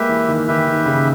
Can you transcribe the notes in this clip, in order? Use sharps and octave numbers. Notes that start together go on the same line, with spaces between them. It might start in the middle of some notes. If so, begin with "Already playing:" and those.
Already playing: G#3 A#3 G4 B4 E5
E3
D#3
D#3 G4 B4 E5
D#3
C#3